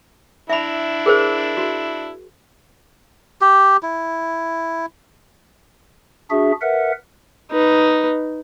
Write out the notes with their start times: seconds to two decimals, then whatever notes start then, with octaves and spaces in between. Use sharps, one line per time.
0.49 D4 E4 E5 B5
1.06 G#4 A#4 C5
1.57 F#4
3.41 G4
3.83 E4
6.31 D4 F#4 G#4 E5
6.62 A#4 B4 E5 F#5
7.51 D#4 B4